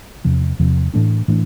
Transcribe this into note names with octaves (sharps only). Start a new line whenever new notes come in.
E2 C3 F3
E2 C3 F3
A2 E3 A3 D4
A2 E3 A3 D4